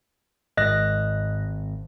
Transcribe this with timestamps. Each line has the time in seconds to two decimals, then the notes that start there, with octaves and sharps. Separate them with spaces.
0.57 G#1 G#2 D#5 F#6 A#6